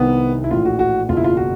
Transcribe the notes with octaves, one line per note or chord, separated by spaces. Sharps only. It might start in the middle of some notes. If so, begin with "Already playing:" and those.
Already playing: C2 C3 D#3 B3
E4
A#1 A2 E3 F4
F#4
F#4
F#1 E2 B2 F4
E4
F4
F#4